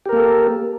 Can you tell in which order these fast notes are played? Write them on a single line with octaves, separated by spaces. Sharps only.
G4 A#4 A#3 A4